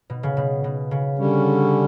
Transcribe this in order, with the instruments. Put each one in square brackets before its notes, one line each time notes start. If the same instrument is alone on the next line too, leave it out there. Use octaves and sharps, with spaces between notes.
[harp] B2
C#3
B2
B2
C#3
[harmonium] D3 G3 C#4